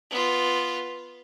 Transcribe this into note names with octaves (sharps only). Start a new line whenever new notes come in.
B3 F4